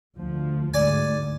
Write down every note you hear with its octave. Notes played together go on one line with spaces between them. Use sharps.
D2 F3
D2 G#2 D5 G#5